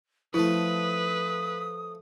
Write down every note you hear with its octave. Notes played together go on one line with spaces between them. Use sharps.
F3 A3 E4 B4 D#6